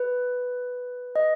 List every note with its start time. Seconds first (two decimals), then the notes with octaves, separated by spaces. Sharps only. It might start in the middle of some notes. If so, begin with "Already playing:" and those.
Already playing: B4
1.16 D#5